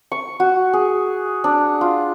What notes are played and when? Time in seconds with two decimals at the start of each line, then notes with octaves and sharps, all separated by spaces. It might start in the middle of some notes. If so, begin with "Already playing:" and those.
0.12 C#6
0.40 F#4
0.73 G#4
1.44 D4
1.81 F4